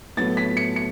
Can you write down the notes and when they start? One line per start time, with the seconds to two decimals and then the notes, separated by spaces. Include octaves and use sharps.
0.17 A2 F#3 B3 A6
0.37 B6
0.57 C#7
0.76 C#7